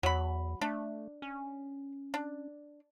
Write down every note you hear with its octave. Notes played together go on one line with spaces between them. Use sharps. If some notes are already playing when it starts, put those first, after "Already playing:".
E2 F#3 B5
A3 D4
C#4
D4